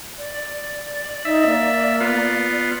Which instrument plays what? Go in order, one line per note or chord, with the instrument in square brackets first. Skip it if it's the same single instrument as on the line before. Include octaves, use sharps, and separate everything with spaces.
[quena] D5
[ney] D#4 [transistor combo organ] E5
[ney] A#3
[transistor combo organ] B3 F4